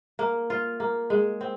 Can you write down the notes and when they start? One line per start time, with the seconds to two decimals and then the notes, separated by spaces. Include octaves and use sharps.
0.19 A#3
0.50 F4
0.80 A#3
1.10 G#3
1.41 C4